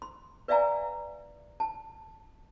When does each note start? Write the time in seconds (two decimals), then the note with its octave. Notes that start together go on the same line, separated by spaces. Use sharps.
0.02 C6
0.48 B4 D5 E5 F5 G#5 A#5
1.60 A5